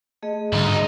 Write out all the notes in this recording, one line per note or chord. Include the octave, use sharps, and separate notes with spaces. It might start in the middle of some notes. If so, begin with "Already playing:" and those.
A3 G#4 D#5
D2 G#2 D3 G3 D#4